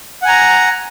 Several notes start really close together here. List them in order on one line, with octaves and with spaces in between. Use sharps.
F#5 G#5 A#5